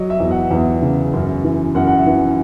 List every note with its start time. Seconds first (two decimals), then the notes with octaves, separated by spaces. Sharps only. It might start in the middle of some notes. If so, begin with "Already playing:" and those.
Already playing: F#3 D#5
0.10 E5
0.20 E2
0.31 F#5
0.51 E2
0.82 C#3
1.13 F#2
1.44 E3
1.75 F#2 F#5
1.87 F#5
1.96 E5
2.06 E3